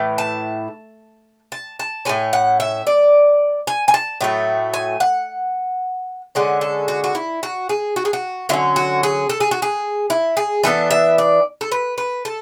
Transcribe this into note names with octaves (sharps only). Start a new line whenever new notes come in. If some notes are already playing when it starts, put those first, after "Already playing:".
Already playing: A2 E3
A5
A5
A5
A2 G#3 C#4 G#5
F#5
E5
D5
G#5
G#5
A5
A2 F#3 A3
G#5
F#5
D3 G#3 C#4 F#5
A4
F#4
F#4
E4
F#4
G#4
F#4
G#4
F#4
D3 F#3 C#4 E4
F#4
G#4
A4
G#4
F#4
G#4
E4
G#4
E3 B3 D4 A4
E5
D5
A4
B4
B4
A4